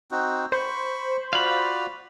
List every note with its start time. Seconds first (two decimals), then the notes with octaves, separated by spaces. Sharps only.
0.11 C4 D#4 F#4
0.52 C5 B5 C#6
1.33 F4 F#4 D5 F5 B5